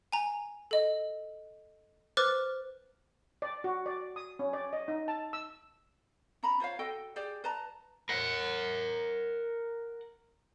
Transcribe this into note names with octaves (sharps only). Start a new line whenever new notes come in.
G#5 A#5
A4 D#5
B4 C5 D6 F6 F#6 A6
D5
F#4
D5
D#6
C#4
D5
D#5
D#4
A5
E6
C#4 A#5 B5
F4 C5 C#5 F5
F#4 A4 D#5 G5
G4 G#4 D5
B4 A5 A#5
A#4 F#5